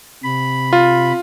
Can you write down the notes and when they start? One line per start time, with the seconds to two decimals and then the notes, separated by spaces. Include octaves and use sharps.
0.24 C3 B5
0.73 F4